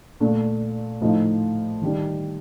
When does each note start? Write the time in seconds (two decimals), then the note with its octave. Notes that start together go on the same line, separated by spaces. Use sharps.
0.20 A#2 A3 D4
1.01 A2 F3 A3 D#4
1.81 D#3 G3 D4